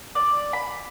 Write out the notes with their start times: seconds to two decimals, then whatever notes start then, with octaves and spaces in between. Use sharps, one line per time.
0.15 D5
0.53 B5